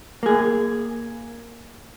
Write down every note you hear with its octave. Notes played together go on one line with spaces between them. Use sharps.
A#3 G#4